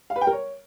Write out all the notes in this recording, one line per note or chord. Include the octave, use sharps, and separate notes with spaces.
F5
B4
G5
A#4
C#5